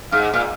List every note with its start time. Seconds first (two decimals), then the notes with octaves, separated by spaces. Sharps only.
0.12 G#2 F5
0.33 A#2 F5